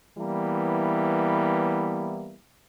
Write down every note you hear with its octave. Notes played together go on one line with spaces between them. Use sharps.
E3 G3 A#3 B3 E4